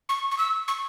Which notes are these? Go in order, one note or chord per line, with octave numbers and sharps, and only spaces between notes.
C#6
C#6
E6
C#6